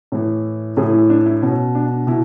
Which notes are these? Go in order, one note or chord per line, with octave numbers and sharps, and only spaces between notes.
A2 E3
A2 E3 G#4
E4
D4
E4
B2 C#4
D4
B2 E4